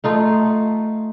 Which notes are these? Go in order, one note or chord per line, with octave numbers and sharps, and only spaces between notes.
A3 D#4 F4